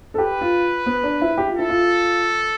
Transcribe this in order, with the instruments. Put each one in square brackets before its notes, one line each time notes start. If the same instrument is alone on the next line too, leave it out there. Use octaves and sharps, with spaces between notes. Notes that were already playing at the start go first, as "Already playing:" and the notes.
[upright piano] A4
[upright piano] G4 [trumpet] B4
[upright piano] F4
B3
D4
E4
G4
F4
[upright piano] E4 [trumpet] A4
[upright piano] F4